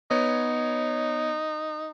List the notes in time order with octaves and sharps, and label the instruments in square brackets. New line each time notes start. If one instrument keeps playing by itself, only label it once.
[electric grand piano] B3 C#5 [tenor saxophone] D#4